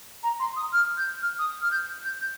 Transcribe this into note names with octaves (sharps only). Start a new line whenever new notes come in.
A#5
C6
D#6
F6
G6
F6
D#6
F6
G6
G6
G6